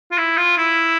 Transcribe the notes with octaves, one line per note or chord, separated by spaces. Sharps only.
F4
E4
F4
E4